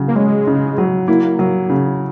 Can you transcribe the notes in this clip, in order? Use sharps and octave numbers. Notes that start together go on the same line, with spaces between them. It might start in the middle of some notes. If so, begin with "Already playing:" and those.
Already playing: C#3 F#3
A#3
G#3 C#4
C#3
F#3
A#3 E4
F#3
C#3